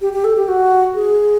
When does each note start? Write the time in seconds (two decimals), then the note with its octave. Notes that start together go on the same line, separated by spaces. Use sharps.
0.01 G4
0.13 G4
0.24 A4
0.37 G4
0.48 F#4
0.95 G#4